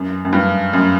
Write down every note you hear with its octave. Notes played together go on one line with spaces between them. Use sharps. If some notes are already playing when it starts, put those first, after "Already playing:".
Already playing: F#2
F#2
G2
F#2